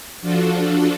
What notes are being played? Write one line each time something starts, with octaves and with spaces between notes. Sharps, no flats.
F3 D4 F4 F#4 A4